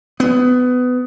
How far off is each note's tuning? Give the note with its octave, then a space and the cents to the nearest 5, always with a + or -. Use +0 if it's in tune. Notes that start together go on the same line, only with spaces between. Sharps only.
B3 +20